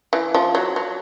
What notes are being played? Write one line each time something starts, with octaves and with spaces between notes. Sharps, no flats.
E3
F3
F#3
F#3